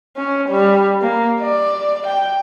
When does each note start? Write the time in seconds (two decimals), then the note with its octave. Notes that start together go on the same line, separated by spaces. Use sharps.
0.17 C#4
0.49 G3
1.02 A#3
1.41 D5
2.07 G5